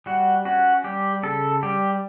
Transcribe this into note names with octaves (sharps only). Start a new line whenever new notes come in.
G3 F#4
C#4 F#4
G3 G4
C#3 A4
G3 G4